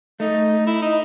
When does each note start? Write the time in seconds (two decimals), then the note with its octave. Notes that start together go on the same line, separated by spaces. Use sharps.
0.20 A3 D#4
0.67 E4
0.82 D#4